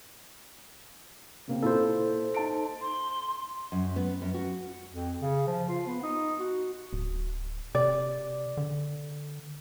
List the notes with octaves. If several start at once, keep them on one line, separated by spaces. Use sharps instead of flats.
C#3 A#3 C4
A#2 E4 F4 A4 C5
D#4 A5 D7
C6
F#2
B3
F#2
F#4
F2
C#3
F3
F4
B3
D#4
F#4
D1
C3 D5
D3